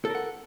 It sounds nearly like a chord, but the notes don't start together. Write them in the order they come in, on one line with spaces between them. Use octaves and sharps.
A4 A#4 F#5